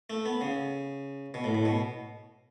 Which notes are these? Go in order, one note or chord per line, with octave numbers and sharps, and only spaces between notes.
A3
B3
C#3
B2
A2
A2
B2